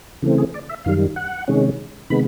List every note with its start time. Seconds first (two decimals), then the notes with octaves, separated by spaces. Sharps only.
0.22 C#3 E3 A3 C4
0.38 G#4
0.54 D5
0.69 E5
0.85 F#2 D#3 G3 F5
1.16 F#5
1.48 C3 D#3 G#3 C#4
2.10 C3 D#3 G#3 B3 B5